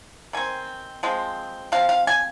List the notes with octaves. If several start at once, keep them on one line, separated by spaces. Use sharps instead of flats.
D#3 C4 G#5
F3 G#3 C4
F3 C4 F5
F5
G#5